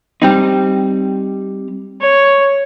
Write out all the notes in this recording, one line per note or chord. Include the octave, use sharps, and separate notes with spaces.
G3 C4 D#4
C#5